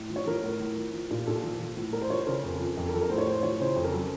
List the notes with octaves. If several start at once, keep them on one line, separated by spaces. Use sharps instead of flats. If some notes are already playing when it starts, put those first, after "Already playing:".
Already playing: A2
F3
C#5
F3 A#4
A2
A2
F3
F3
A#2
A#2 A4
F3
F3
A2
A2 A#4
C5
F3 C#5
C5
C#3 A#4
F2
F3
F2
A#4
F3 A4
A#4
A2 C5
C#5
A2 C5
F3 C#5
C#3 C5
F2
A#4
F#3 A4